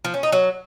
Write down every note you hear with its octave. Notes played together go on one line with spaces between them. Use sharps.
F3
C#4
D#4
F#3